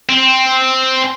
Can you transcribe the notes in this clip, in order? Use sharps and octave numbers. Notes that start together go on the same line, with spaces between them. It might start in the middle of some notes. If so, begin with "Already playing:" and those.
C4